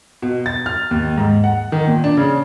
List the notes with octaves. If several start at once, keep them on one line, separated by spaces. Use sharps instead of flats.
B2
A6
F6
D#2
G#2
F#5
D#3
A#2
D4
C#3